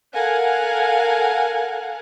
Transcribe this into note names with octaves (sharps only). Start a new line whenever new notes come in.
A4 A#4 F5 F#5 G#5